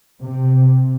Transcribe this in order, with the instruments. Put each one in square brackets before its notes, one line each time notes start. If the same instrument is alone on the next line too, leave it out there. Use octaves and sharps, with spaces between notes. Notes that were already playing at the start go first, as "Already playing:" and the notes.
[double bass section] C3